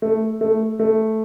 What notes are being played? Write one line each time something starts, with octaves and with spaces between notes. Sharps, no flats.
A3
A3
A3